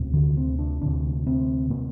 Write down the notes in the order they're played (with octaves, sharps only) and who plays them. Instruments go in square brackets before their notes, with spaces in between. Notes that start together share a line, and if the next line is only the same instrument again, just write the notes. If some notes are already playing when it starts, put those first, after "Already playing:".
Already playing: [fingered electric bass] D2 C3
D3
C4
D4
D2 C3 D4
C4
C3 A#3